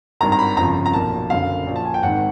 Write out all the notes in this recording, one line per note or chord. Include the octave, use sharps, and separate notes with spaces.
G#1 G2 D#3 A#5
A#5
B5
G1 F2 C#3 F3 A#5
A#5
B1 A#2 F3 A5
F#1 F#2 D3 F5
A#1 A#2 F3
A5
G#5
G5
G#1 G#2 D#3 F#5